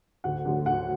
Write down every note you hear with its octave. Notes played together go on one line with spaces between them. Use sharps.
D2 F#5
D3 F#3 A3
D2 F#5